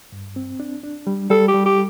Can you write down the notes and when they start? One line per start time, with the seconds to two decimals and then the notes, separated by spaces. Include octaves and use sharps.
0.12 G2
0.36 C4
0.60 D4
0.84 D4
1.07 G3
1.30 G3 A4
1.48 G4
1.54 G3
1.66 G4